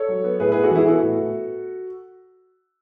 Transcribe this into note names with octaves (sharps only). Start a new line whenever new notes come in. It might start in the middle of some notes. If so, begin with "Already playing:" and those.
Already playing: A4 C#5
F#3
B3
A2 G#4 B4
B3 G#4 B4
F#4 A4
E3 E4 G#4
B3 F#4 A4
A2
A2